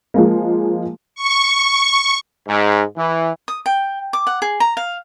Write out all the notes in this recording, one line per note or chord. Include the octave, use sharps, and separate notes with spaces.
F3 G#3 A#3
C#6
G#2
E3
D#6
G5
D6
F#5
G#4
A#5
F5